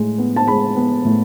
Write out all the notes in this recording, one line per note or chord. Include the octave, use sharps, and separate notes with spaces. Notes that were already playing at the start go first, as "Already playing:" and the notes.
Already playing: A2 G#3
B3
A5
G#3 B5
B3
A2